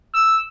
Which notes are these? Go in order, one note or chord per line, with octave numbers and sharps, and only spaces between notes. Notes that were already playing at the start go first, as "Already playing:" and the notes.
E6